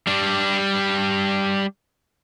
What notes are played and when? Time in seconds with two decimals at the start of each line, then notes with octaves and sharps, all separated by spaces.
0.07 G3 D4